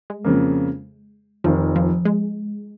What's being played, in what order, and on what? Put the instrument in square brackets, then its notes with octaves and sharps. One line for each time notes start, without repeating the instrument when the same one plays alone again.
[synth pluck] G#3
[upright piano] F2 C#3 A#3
[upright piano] F1 F2 D#3 [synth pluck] F3
[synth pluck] F3
G#3